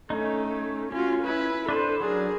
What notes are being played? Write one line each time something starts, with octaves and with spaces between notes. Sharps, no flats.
A3 C#4 D#4
C#4 F4 F#4
E4 B4
D4 A4 B4 C5
F#3 D4 G#4 A#4